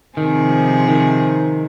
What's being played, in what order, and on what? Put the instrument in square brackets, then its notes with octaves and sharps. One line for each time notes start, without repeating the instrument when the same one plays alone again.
[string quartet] C3 F3 C4 G#4 [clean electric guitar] D#3
[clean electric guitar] D#3